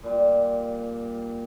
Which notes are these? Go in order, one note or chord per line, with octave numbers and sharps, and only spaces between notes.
A#2 G3